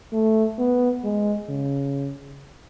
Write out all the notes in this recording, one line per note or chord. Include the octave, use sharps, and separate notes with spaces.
A3
B3
G#3
C#3